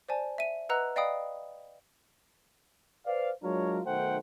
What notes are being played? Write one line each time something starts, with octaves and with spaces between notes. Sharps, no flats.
C5 D5 G#5 A5
E5 D#7
B4 D#5 F#5 A#5 E6 F#6
D5 D#5 F5 G5 B5 D#6
B4 C5 D5 F5
F#3 G#3 D4 F4 A#4 C#5
B1 D#3 A3 C5 F#5 G5